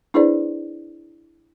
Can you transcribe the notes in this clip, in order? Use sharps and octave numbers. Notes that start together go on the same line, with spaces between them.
D4 E4 G#4 B4 C5 D5